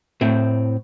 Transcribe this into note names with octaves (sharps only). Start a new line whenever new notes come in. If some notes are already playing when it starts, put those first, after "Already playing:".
A2 C4